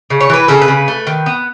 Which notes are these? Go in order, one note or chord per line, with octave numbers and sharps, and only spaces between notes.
C#3
C#5
E3 B4
C#3 A4
B4
C#3
A3
D#3
B3